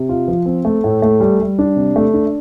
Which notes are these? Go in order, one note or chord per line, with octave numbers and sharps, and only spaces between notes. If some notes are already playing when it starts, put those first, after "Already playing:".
Already playing: C3
F4
F3
C4
A3
A2
A3
G3
G3
D4
C3
A3
D4